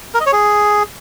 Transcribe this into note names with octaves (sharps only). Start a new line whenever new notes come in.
A#4
D#5
C#5
G#4